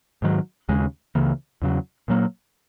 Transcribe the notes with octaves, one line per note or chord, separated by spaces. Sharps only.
G#2 D#3 F#3
D#2 C#3 G#3
C#2 C#3 E3 A#3
E2 C#3 F#3
A#2 F#3 A#3